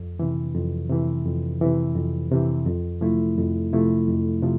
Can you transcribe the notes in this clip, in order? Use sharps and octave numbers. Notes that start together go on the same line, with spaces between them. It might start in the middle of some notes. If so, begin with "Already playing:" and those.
Already playing: F2
C3 E3
F2
C3 E3
F2
C3 E3
F2
C3 E3
F2
C3 F3 A3 E4
F2
C3 F3 A3 E4
F2
C3 F3